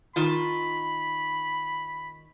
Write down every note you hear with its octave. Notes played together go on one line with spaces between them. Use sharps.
D#3 F4 B5